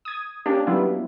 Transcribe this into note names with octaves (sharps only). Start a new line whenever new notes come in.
D#6 G#6
A#3 C#4 D4 G4
F#3 G3 B3 E4 F4